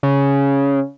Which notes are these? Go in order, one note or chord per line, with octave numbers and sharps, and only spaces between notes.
C#3